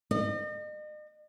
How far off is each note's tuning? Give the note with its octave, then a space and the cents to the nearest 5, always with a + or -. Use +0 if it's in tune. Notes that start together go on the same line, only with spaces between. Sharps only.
D#5 -40